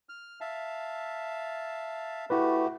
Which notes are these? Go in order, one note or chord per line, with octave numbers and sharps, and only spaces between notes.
F6
E5 F5 A5
A3 E4 F#4 G4 B4